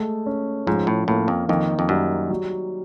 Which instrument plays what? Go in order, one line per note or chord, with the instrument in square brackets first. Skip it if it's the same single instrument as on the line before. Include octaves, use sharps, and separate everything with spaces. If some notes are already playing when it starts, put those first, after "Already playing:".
Already playing: [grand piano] G#3 A3
C#4
[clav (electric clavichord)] G#2 [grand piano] F3
[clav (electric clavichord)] A2
[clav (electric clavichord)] A2 [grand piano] A#3
[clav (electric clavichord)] F2
[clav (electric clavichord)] F2 [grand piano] D#3
[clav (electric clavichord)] F2
[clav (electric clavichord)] F#2 [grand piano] G3
[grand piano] F#3